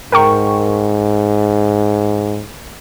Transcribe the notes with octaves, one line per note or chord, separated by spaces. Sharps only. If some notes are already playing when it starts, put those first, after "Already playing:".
G#2 A#4 G5 C#6